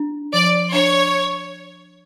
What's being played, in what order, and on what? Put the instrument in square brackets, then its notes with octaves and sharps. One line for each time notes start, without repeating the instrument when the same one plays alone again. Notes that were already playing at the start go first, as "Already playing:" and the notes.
Already playing: [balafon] D4
[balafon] F3 [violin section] D5
[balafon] D4 [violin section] C#5